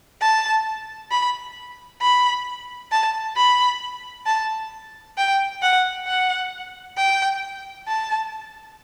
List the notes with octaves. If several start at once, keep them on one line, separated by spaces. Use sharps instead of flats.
A5
B5
B5
A5
B5
A5
G5
F#5
F#5
G5
A5